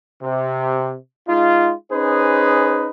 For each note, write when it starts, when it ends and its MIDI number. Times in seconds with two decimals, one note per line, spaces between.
0.23 0.94 48
1.27 1.72 56
1.27 1.72 63
1.27 1.72 65
1.91 2.90 61
1.91 2.90 63
1.91 2.90 68
1.91 2.90 71
1.91 2.90 72